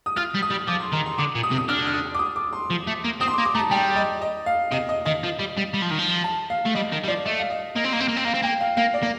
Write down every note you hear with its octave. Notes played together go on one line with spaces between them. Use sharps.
D#6
F4 F6
G3
D#6
G3
F3 D6
C6
D#3 A#5
C6
D3 D6
A#2
D#6
C3
D#6
D3 F6
F6
D#6
D6
D#6
D6
C6
F3
A3
A#3
C4 D#6
C6
D6
A#3
D6
A3 A#5
A5
G3 G5
D#5
D#5
F5
C3 D#5
D#5
D#3 D#5
F3
G3
G3
G3
F3
D#3
F3
A5
F5
A3
G3 D#5
D#3
G3
F3 D5
A3 D#5
F5
D#5
A#3 D#5
C4
A#3
C4
A#3
C4
A#3 F5
C4
A#3 G5
F5
A#3 F5
D5
A#3